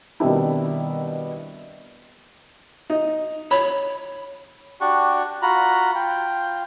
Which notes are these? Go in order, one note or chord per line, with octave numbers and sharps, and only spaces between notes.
B2 D#3 G3 C4 D4 E4
D#4
C#5 B5
D4 F#4 G4 C#6
F4 F#4 A#5 B5
F4 G5